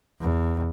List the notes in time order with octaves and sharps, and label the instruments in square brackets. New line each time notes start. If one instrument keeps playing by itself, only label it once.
[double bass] E2